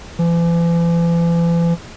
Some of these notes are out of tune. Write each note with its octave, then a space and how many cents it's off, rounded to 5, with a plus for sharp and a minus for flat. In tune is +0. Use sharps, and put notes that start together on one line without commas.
E3 +45